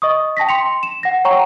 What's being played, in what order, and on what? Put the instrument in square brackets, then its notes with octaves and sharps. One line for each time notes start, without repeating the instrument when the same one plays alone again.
[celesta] D#5 C#6 D#6
G5 A5 A#6 B6
C6 C#7 F7
E7
F#5 A#6
C#5 F#5 G5 A#5 C#6